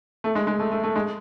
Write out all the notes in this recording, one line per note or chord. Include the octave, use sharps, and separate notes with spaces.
A3
G#3
G#3
A3
A3
A3
G#3